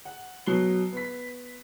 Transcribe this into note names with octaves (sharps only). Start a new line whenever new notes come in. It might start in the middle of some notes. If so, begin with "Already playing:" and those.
F#5
B2 F#3 C7 G7
B3 B6